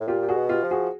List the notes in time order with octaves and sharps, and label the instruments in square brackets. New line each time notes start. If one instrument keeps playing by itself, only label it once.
[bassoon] A2
[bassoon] A#2 [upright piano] F4 G4
[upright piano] G4
F#4 G#4
[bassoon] B2
[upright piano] F4 G4
[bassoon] F3
[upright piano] F#4 G#4